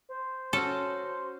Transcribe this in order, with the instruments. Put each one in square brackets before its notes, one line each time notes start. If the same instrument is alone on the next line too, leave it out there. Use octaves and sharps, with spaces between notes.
[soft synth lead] C5
[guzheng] C#4 F#4 [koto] A4